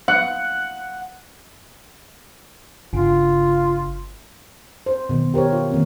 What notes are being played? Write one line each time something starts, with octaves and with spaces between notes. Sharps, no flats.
F#5
G1 C#3 F4
C5
B2 D#3
G4 A#4 C5 C#5
F4
D#3 A#3 C4